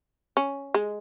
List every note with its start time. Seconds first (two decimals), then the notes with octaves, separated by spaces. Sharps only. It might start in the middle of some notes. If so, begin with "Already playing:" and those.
0.37 C#4
0.74 G#3